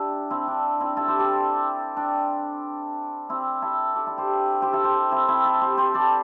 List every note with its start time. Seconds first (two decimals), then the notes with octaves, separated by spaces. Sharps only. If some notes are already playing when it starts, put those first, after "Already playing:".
Already playing: D4 E4 G4
0.30 C4 E4
0.48 D4
0.80 C4 E4
0.97 E4 A4
1.08 G4 C5
1.19 A4 D5
1.97 D4
3.29 C4 E4
3.62 E4 A4
3.95 A4 D5
4.07 E4 A4
4.18 G4 C5
4.62 G4 C5
4.73 E4 A4
4.84 G4 C5
5.12 C4 E4
5.28 C4 E4
5.45 E4 A4
5.61 G4 C5
5.77 G4 C5
5.94 A4 D5